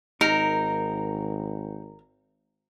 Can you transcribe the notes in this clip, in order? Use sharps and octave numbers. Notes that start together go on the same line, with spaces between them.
G#1 D#4 A#4